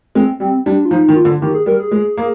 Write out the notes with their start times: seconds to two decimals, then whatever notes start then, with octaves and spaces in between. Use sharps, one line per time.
0.15 G#3 C4
0.40 G3 C4
0.66 G3 D4
0.85 F4
0.91 F3 D#4
1.08 D#3
1.16 F4
1.25 D3
1.41 D#3 G4
1.54 G#4
1.66 G3 A#4
1.79 G#4
1.91 G#3
2.17 A#3